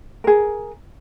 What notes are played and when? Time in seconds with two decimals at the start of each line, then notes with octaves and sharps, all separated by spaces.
0.24 G#4 A#4